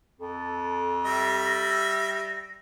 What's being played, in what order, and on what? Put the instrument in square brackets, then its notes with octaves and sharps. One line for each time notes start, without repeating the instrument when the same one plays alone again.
[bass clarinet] F2 [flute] A4
[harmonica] G3 E5 [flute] A#6